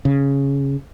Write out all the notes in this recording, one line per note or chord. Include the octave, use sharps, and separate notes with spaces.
C#3